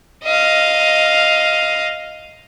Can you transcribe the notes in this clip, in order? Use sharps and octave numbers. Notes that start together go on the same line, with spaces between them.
D#5 F5